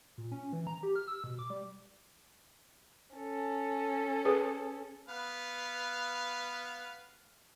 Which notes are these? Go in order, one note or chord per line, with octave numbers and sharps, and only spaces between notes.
A#2
C#4
E3
A#5
G4
F6
E6
B2
D6
G3
C#4 A4
G#4 B4
B3 B4 F5